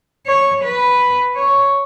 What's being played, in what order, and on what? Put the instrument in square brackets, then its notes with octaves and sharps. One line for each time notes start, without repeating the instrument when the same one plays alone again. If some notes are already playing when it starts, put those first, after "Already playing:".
[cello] C#5
B4
C#5